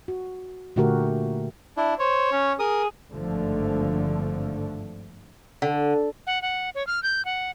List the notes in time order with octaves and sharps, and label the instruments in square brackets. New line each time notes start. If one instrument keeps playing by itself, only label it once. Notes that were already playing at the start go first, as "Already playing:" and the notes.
[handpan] F#4
A#2 D3 A3 F#4 G4 A#4
[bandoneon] D4 E4
[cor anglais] C5 [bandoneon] C#5
[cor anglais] C#4
[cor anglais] G#4 [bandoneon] A#4 D#6
[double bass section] G#1 G2 D3 F3 A3
[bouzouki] D3
[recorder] F#5
F#5
C#5
F6
G6
F#5